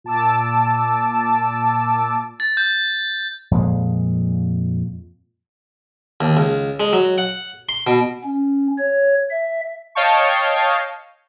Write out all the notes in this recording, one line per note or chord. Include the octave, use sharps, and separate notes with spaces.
A#2 A5 D6 E6
A6
G6
F2 A#2 G#3
D#2
C#2
G#3
F#3
F#5
C6
B2
C#4
C#5
E5
C#5 D#5 F5 G5 A5 C#6